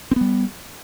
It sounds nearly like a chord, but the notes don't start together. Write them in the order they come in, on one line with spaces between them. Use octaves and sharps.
C4 B3 G3